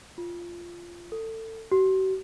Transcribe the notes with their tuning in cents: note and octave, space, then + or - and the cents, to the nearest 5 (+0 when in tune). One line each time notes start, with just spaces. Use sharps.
F4 -10
A4 +25
F#4 +45